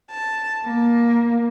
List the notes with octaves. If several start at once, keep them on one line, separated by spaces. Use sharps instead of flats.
A5
A#3